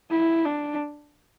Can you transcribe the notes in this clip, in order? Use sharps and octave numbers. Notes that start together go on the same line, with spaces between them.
E4
D4